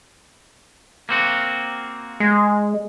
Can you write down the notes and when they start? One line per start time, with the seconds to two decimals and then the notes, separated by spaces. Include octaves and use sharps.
1.09 A#3 C4 F#4
2.20 G#3